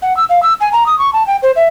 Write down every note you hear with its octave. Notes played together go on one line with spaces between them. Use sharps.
F#5
E6
F5
E6
G#5
A#5
D#6
C#6
A5
G5
C5
E5